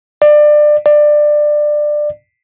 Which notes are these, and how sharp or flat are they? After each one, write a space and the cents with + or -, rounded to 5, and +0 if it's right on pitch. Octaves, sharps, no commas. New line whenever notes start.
D5 +25
D5 +20